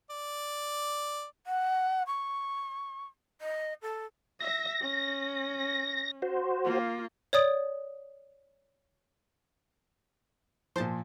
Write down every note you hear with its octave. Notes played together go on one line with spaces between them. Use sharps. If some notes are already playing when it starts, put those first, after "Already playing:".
D5
F#5
C#6
D#5
A4
E5 A#6
C#4
F#4 C5
A#3 F4
C#5 D5 D#6
A#2 F3 C5 A5